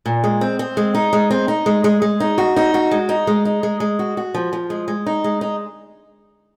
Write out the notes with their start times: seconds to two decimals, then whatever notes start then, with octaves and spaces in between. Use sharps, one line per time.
0.06 A#2
0.24 G#3
0.41 C4
0.59 C4
0.77 G#3
0.95 D#4
1.13 G#3
1.31 C4
1.48 D#4
1.66 G#3
1.84 G#3
2.02 G#3
2.20 D#4
2.38 F#4
2.56 D#4
2.74 F#4
2.91 G#3
3.09 D#4
3.27 G#3
3.45 D#4
3.63 G#3
3.80 G#3
3.99 F#4
4.17 F#4
4.34 F3
4.53 F3
4.70 G#3
4.88 G#3
5.06 D#4
5.24 G#3
5.41 D#4